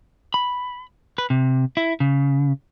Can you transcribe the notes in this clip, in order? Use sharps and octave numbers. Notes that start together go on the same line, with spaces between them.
B5
B4
C3
E4
C#3